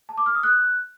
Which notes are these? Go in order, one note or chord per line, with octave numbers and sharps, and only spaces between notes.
A5
D6
F6
D#6
F#6